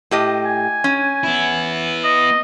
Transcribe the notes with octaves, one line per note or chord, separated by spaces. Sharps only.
A2 G4 D#5
G#5
C#4
B3 E4
D#5